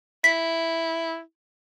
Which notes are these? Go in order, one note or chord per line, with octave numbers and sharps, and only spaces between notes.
E4 B6